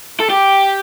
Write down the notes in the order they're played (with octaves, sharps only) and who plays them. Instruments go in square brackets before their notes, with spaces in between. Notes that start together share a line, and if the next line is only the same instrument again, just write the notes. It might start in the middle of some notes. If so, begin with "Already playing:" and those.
[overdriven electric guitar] A4
G4